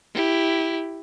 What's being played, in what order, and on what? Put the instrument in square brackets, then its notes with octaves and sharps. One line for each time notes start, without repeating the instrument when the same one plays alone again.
[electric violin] E4 G4